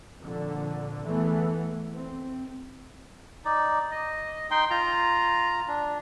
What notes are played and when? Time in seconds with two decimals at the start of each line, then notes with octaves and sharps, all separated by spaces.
0.21 F2 A#2 D3
1.04 E2 E3 A3 B3
1.96 C4
3.45 D#4 D5
3.91 D#5
4.51 D#4 G5 C6
4.70 F4 A#5
5.67 D4